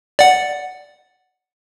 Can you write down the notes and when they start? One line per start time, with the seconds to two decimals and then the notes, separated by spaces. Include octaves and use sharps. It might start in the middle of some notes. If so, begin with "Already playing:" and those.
0.19 D5 F#5